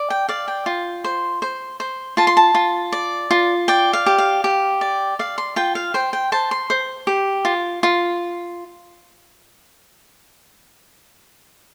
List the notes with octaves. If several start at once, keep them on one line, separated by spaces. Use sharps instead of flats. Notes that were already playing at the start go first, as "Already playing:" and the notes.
Already playing: D5
G5
D5 F5
G5
F4
C5
C5
C5
F4 A5
C6
A5
F4
D5
F4
D5 G5
F5
G4
F5
G4
D5
D5 F5
C6
F4 G5
F5
C5 G5
G5
C5 A5
C6
C5
G4
F4
F4